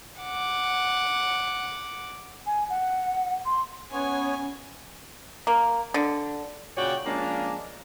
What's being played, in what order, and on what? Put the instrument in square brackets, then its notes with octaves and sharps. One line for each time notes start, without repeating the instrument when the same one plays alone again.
[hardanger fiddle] F#5 D6
[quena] G#5
F#5
C6
[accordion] B3 C#5 [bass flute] C#4 [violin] G#5
[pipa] A#3
D3
[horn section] A#2 C#3 F#4 C#5 D5 G5
F3 G#3 A#3 C#4 D4